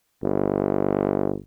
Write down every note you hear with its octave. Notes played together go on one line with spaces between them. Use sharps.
G1